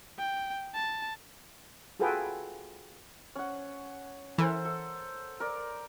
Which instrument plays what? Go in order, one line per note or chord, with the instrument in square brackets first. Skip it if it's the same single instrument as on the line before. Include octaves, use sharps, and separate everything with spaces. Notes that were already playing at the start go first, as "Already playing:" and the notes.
[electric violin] G5
A5
[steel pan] F4 F#4 G#4 A4 B4 G5
[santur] C#4 F#5
[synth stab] E3 [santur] A4 A#4 C5
[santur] A4
A#4 D5